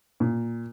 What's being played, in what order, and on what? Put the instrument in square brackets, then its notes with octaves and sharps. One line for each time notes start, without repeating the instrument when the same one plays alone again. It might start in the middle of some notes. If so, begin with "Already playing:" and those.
[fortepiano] A#2